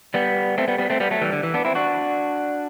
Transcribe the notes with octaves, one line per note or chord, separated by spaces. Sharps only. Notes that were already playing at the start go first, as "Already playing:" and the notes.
G3 B3
A3 C4
G3 B3
G3 B3
A3 C4
G3 B3
F#3 A3
E3 G3
D3
E3
B3 D4
C4 E4
D4 F#4